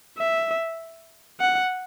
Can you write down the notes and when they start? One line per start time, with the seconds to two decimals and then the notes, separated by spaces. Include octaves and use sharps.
0.18 E5
1.41 F#5